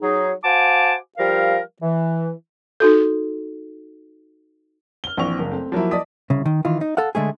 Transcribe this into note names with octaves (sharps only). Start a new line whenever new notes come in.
F#3 D#4 G#4
F#4 C5 F5 G#5 A5 D6
F3 G3 A#4 F5
E3
D#4 F#4 A4
F6 G7
A#1 E3 C4 C#6 F7
F#1
A3 C4
F3 F#3 A#3 E4
D5 D#5 A5 D#6 B6
C2 C#3
D#3
D#3 E3 F4
D#4
A4 F5 F#5
D3 G#3 A3 G#4